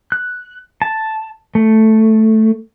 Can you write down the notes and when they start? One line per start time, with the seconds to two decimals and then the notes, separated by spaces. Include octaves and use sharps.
0.12 F#6
0.82 A5
1.55 A3